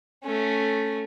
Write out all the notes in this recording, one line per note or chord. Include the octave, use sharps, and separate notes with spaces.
A3 C#4